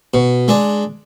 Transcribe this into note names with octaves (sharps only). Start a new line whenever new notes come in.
B2
G#3 D4